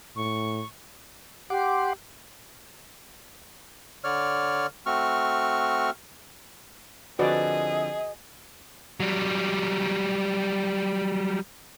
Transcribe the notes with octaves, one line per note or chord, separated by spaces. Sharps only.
A2 C#6
G4 F#5 C6 D6
D3 C#5 D5 F6
A3 C4 F#4 C#6 F6
D3 F3 C4 F#4 G#4 B4 D5 D#5
F#3 G3